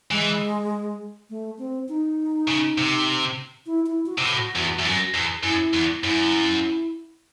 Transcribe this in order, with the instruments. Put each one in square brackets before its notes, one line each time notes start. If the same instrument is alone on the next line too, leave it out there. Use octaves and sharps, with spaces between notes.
[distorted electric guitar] E3 [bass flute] G#3
[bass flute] A3
C4
D#4
[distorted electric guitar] C#3
C3
[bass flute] E4
E4
F#4
[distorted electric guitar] C3
A2
E2
E2
F#2
E2
[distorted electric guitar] F#2 [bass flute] E4
[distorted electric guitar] E2
[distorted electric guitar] F#2 [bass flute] E4